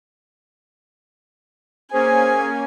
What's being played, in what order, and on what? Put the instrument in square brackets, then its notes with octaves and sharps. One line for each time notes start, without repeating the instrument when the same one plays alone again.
[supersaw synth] A#3 C#4 [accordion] G#4 [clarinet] C5 [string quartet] G#5